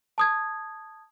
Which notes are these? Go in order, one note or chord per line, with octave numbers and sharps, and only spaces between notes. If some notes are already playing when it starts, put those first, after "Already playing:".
A5 D#6 G#6